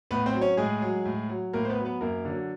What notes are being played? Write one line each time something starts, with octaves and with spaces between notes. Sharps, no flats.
A2 B3 B4
C4 C5
F#3
C#4 C#5
A2 G#3 G#4
F#3
A2
F#3
A2 A#3 A#4
C5
B3 B4
F#3
B3 B4
F#2 A#3 A#4
D3 F#3